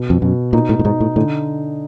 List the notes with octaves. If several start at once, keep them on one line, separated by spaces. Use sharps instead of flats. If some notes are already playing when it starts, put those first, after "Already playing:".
Already playing: B2
F2
F#2 B2
A#2 D#4
A2
A2
G#2 D#4
A2
A2 D3